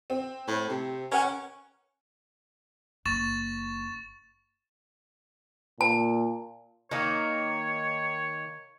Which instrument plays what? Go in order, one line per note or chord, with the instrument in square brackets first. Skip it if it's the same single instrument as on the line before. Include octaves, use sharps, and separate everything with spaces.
[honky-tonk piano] C4
[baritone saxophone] A2
C3
[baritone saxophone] C#4 [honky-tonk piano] A#4 F#5 G#5
[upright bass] F#1 [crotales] C#6 A6 E7
[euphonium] A#2 [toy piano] A5
[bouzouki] D#3 A#3 [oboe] C#5